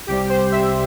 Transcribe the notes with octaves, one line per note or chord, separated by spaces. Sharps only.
C2 C3 G3 G4
C5
E5